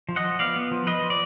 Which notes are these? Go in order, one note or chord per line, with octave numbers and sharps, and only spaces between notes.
F3
D#5 F#5
F3
B3 D5 F5
B3
F3
F3 B4 D#5
F3
D5